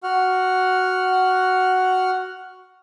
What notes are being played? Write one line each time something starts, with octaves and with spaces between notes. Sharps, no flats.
F#4 F#5 F6